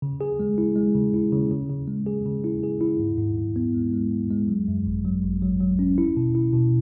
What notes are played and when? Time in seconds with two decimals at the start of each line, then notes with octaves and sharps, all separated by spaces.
0.02 C#3
0.21 G#4
0.39 G#3
0.58 E4
0.76 G#3
0.95 C#3
1.14 E4
1.32 C#3
1.51 C#3
1.70 C#3
1.88 G#3
2.06 G#4
2.25 C#3
2.44 E4
2.63 G#4
2.81 E4
2.99 G#2
3.18 G#2
3.37 G#2
3.56 B3
3.75 G#3
3.93 G#3
4.11 G#2
4.30 G#3
4.48 F#3
4.68 F#2
4.86 G#1
5.05 F#3
5.24 G#1
5.42 F#3
5.61 F#3
5.79 C#4
5.98 E4
6.17 B2
6.35 E4
6.53 B2